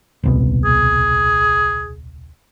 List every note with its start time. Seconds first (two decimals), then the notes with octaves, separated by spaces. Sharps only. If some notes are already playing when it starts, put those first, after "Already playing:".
0.23 D#1 C2 B2
0.65 G#4